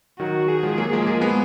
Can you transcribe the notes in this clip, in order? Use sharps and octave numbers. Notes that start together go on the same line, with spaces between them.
D#3 F#3 F#4
G#4
F3 G#3
F#3 A#3
F3 G#3
A#3
F3 G#3
G#3 B3